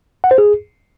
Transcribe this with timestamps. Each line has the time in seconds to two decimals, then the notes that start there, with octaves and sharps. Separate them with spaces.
0.24 F#5
0.31 C5
0.38 G#4